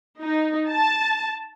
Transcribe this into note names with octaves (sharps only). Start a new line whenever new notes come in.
D#4
A5